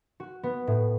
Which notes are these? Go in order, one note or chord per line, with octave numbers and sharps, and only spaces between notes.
F#4
B3
A2